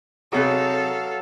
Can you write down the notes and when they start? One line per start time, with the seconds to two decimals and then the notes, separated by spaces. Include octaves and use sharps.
0.32 C3 F#3 D#4 G#4 A4 B4 F5